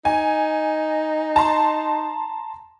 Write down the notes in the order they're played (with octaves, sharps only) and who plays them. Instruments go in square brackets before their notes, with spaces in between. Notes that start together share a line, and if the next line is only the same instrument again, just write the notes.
[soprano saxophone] D#4 [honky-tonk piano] G#5
[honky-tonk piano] A5 A#5 C6